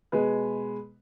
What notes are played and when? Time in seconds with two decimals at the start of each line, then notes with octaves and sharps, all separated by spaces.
0.12 B2 G#3 G#4 B4